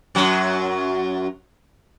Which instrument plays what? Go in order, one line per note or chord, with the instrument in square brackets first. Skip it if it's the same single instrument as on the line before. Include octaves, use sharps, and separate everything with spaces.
[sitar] F#2 F#3